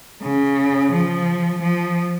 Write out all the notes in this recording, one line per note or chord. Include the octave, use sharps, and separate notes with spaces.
C#3
F3
F3